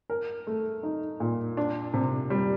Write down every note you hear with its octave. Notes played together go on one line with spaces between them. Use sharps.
A#4
A3
D#4
A#2
D4
C3
G3